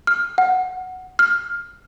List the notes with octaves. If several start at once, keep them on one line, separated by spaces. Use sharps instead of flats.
F6
F#5
F6